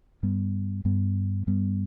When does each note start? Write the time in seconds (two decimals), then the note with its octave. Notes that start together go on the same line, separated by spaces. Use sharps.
0.23 G2 G3 B3
0.85 G2 G3 B3
1.47 G2 G3 B3